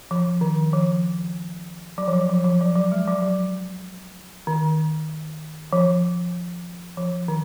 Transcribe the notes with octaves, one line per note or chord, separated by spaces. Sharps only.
F3
D#3
F3
F#3
F3
F#3
F3
F3
F#3
F#3
G#3
F#3
F#3
D#3
F3
F3
D#3